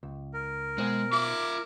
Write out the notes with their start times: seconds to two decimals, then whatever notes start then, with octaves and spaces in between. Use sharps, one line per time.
0.03 C#2
0.34 A#4
0.78 B2 G#3 C5 G#5
1.13 F4 E5 D6